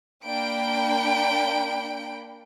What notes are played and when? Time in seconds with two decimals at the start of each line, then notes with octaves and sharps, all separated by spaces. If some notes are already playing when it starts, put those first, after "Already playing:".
0.25 A#3 D4 G5 B5 D7